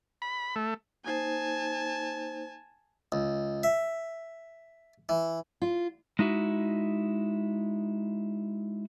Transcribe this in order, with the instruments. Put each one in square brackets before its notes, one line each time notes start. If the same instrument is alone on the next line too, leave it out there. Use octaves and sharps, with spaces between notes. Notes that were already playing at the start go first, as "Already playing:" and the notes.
[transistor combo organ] B5
A3
[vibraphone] A#3 D#4 C5 [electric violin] G#5 A5
[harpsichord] C#2
E5
E3
[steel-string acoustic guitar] F4
[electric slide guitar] G#3 D#4 E4 F#4